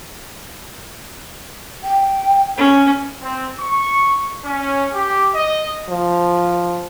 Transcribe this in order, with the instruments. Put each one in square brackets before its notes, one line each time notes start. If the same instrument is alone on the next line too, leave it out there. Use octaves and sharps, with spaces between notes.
[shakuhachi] G5
[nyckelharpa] C#4 [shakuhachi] C#5
[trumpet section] C4
C#6
C#4
G4
D#5
[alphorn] F3